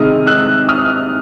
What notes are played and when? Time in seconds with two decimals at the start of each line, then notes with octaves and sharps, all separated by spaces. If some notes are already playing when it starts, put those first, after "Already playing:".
Already playing: C3 D#3 G#3 D#6 F6
0.27 E6 F#6
0.68 D#6 F6